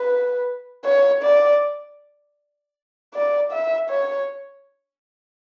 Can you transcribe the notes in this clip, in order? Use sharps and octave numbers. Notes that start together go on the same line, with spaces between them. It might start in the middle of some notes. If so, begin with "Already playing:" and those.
Already playing: B4
C#5
D5
D5
E5
C#5